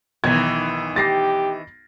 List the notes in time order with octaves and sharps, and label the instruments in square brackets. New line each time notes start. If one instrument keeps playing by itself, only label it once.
[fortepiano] B1 [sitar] D#3 E3 [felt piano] G#6
[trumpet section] G4 [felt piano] A6 A#6 C7